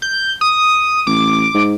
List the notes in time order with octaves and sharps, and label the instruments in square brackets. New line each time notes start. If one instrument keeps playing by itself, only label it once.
[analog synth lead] G6
D#6
[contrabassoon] A1 [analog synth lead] D6
[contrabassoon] G#2